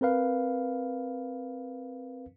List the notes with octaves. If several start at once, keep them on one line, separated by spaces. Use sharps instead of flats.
C4 A#4 B4 F5